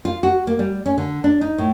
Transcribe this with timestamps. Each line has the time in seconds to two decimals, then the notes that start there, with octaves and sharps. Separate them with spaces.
0.05 F4
0.23 F#4
0.47 A#3
0.59 G3
0.86 C#4
0.98 D3
1.24 D4
1.41 D#4
1.58 A2